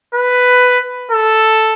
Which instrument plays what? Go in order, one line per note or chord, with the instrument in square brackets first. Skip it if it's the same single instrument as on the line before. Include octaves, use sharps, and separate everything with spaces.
[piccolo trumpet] B4
A4